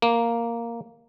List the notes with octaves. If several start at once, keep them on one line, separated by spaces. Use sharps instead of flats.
A#3